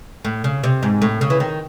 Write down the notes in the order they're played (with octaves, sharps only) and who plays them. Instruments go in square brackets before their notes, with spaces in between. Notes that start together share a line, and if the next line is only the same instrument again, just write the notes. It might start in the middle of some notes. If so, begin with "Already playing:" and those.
[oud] A2
C#3
C3
G#2
A2
C#3
E3
D#3